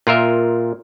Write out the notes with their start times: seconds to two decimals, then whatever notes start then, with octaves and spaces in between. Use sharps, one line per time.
0.07 A#2 F4 A#4 E5